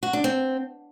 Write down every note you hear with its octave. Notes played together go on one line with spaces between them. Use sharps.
F#4
D4
C4